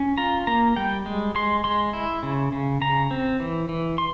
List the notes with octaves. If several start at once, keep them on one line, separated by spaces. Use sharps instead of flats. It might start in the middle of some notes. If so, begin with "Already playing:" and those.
Already playing: C#4
F4 A#5
A#3 A#5
G3 G5
G#3
G#3 C6
G#3 C6
E4
C#3
C#3
C#3 A#5
C4
E3
E3
C6